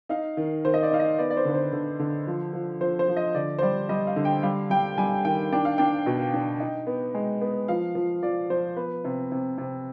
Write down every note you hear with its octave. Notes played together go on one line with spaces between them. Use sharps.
D#4 F5
D#3
D#3 C5
D#5
D5
D#4 F5
D#5
B3 D5
D5
C5
D3 B4
C5
D3
D3
F3
F3
F3 C5
C5
F3
D#5
D3 D5
C5
G3 D5
G3 D#5
F5
D3
G5
G3 F5
G3 G5
G3 G#5
D#3 G5
D4 G5
F5
D4 G5
B2
D4
D#4
B3
G#3
B3
F3 F5
F3
F3 D5
F3 C5
B3 B4
C3
C3
C3